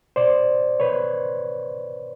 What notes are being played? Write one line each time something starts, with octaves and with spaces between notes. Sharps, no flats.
B2 C5 D5
B2 B4 C#5